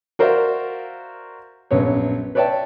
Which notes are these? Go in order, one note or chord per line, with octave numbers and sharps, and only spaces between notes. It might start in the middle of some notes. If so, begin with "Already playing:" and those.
F#4 A#4 C5 D5 E5 F5
A#1 F#2 B3 C#5
B4 C#5 D5 E5 G5 A5